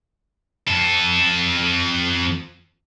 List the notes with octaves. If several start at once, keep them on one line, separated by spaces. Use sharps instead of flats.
F2 A4